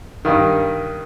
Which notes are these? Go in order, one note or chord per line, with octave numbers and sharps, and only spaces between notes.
G2 D#3